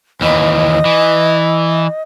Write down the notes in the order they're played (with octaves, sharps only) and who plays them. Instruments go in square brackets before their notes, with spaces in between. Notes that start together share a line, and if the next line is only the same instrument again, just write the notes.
[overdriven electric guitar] D#2 E3 [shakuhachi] D#5
[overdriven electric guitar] E3